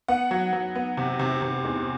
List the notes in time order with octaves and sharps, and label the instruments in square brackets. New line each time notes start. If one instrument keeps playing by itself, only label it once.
[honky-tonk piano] B3 F#5
F#3
F#3
B3
C3
C3
C3
E2